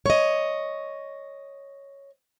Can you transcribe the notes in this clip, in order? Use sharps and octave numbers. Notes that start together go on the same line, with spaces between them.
C#5 D#5